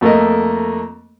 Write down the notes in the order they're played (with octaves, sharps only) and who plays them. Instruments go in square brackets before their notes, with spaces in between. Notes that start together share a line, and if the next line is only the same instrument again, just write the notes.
[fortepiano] F2 A3 A#3 A#4 D#5